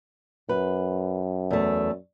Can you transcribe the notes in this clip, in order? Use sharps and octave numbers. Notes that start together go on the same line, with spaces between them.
F#2 B4
E2 A3